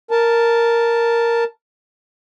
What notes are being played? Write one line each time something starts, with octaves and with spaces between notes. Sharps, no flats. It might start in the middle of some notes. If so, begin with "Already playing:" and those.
A#4 A5